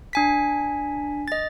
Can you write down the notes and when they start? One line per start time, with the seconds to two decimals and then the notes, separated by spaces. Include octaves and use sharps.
0.13 D4 G#5 B6
1.28 D#5 A6